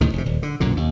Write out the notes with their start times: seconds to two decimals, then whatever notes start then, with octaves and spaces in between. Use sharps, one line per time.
0.01 D2 A2 C3 D#3
0.13 F1 C3
0.26 D#1
0.43 D3
0.60 B1 F#2 A#2 D3
0.77 D#2